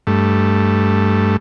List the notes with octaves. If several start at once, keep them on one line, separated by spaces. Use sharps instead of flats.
G2 A3